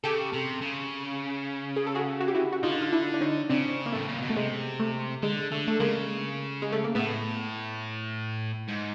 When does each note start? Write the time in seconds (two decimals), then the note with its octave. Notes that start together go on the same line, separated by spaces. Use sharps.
0.04 C#3 G4 A4
0.33 C3
0.62 C#3
1.76 G#4
1.87 A4
1.95 F#4 G#4
2.20 F#4
2.28 G4
2.35 E4 F#4
2.52 F#4
2.63 D3 D#4 F4
2.82 F4
2.92 D4 E4
3.14 D4
3.21 C#4 D#4
3.50 C#3 C4 D4
3.86 A#3
3.92 A2 A3
4.09 A#2
4.22 B2
4.30 A3
4.36 C3 G#3
4.80 A3
5.23 D3 G#3
5.51 D3 A3
5.68 A3
5.80 C#3 G#3 A#3
6.62 G#3
6.72 A3
6.84 A#3
6.95 A2 A3 B3
8.68 G#2